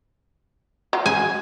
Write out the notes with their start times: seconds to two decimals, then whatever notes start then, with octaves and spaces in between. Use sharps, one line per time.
0.93 F#3 F4
1.06 G#3 G#5